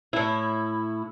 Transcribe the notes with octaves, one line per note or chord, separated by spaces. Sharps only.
A2 E4